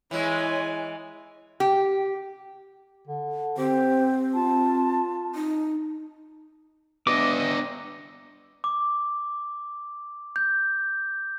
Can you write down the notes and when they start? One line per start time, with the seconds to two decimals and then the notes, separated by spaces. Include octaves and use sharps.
0.11 E3 G#3 E4 C#5 G#5
1.60 G4
3.07 D3
3.57 C4 G4 C5
4.34 F4 A5
5.35 D#4
7.07 B3 D4 D#5 E5 D6
8.64 D6
10.36 G6